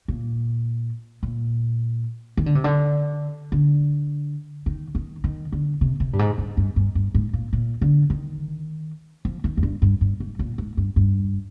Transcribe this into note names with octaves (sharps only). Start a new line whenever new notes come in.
A#2
A#2
D#3
D3
C3
D3
D3
D#3
D#3
D#3
D3
C3
C3
G2
G#2
G2
G2
G2
G2
G#2
A#2
A#2
D3
D#3
F3
D#3
F2
G2
G2
G2
G#2
A#2
G#2
G2
G2